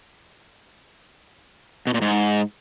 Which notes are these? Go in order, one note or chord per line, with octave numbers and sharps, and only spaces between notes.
B2
A#2
G#2